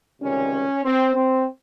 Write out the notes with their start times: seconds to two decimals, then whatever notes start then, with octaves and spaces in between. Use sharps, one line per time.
0.22 C#2 C3 D#3 G3 C#4
0.84 C4
1.15 C4